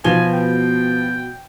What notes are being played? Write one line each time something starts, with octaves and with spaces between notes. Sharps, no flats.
B2 F3 G#5 G7
G5